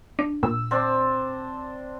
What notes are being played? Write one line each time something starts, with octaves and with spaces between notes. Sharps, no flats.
D4
A#2 E6
C4 D4